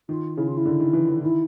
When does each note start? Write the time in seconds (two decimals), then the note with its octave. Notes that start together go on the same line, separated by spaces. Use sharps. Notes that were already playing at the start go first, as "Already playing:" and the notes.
0.09 D#3 F4
0.37 C#3 E4
0.47 F4
0.57 E4
0.65 D3
0.80 D#3
0.93 E3
1.09 E3
1.22 D#3 E4